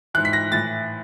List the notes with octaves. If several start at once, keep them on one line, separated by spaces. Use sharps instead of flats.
G#2 E3 F#6
B6
A#6
A2 E3 A6